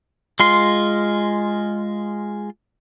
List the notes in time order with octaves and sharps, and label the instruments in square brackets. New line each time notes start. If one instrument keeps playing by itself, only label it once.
[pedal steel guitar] G#3 F4 C6